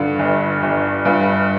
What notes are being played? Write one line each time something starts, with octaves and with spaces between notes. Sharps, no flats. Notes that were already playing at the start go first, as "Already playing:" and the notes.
Already playing: G2 D3 F4
G1
G1
G2 F4